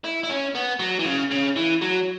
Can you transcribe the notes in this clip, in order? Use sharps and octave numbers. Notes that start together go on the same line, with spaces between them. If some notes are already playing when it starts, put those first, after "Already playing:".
E4
E4
C#4
B3
F#3
E3
C#3
C#3
E3
F#3